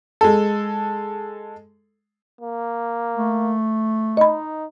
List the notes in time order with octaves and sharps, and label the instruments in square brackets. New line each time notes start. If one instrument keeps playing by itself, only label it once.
[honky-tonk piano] G#3 A4
[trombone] A#3
[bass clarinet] A3
[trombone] D#4 [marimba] D#5 B5